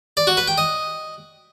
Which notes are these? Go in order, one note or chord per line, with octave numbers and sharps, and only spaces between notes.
D5
F#4
B4
G5
D#5